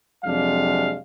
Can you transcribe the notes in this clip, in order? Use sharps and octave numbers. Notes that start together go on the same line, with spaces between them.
F2 C3 F#3 G#3 D4 F5